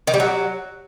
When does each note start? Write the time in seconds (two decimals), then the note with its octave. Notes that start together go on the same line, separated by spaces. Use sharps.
0.07 D#3
0.14 G3
0.20 F#3